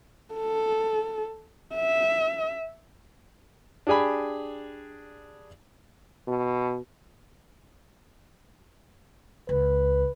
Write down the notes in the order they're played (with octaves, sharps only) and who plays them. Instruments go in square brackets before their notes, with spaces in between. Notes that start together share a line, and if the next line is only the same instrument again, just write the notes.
[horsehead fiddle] A4
E5
[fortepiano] D4 G4 G#4 G#5 B5
[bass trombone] B2
[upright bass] C#2 [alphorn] B4